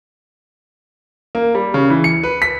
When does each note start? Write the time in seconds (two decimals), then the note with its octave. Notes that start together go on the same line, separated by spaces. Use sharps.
1.35 A#3
1.55 G3
1.74 C#3
1.90 E3
2.04 C#7
2.23 B4
2.42 B6